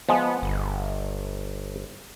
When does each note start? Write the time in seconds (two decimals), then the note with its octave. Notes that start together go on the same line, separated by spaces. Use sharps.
0.09 F3 G#3 B3
0.42 G1